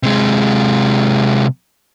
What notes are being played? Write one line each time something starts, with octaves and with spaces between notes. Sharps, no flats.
C3 G#3